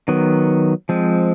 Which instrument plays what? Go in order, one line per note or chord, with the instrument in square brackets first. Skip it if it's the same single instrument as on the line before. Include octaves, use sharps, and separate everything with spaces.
[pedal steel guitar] D#3 F#3 B3
F3 G#3 C4